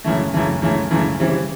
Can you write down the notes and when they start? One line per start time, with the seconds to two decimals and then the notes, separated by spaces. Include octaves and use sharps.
0.04 F#2 C#3 E3 A3
0.34 F#2 C#3 E3 A3
0.62 F#2 C#3 E3 A3
0.91 F#2 C#3 E3 A3
1.20 C#3 E3 G3 C4